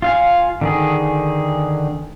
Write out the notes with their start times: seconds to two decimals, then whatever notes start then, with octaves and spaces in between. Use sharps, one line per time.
0.02 F4 F5 G#5
0.61 D3 D#3 G#4